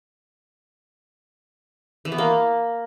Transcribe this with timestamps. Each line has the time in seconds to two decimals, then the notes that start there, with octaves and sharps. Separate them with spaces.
2.05 E3
2.12 B3
2.18 A#3